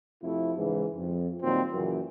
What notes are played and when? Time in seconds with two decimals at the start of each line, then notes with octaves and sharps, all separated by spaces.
0.23 F2 C3 A3 E4
0.58 G#2 C#3 E3
0.96 F2
1.42 A#2 D#3 F#3 G3 C4
1.73 F#2 A#2 C#3 E3